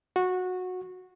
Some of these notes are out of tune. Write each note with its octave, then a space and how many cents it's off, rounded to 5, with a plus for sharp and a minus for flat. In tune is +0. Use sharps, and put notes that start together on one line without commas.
F#4 -15